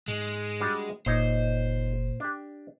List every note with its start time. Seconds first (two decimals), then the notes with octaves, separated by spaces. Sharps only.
0.08 G#2 G#3
0.60 G3 D4 F#4
1.06 F#1 A#2 D#4 C5 C#5
2.20 D4 G4